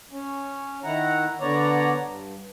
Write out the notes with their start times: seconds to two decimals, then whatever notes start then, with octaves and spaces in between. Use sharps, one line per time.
0.11 C#4
0.84 D#3 E4 F#5 A#5
1.41 D3 B3 C#5 D5 A#5
2.04 G2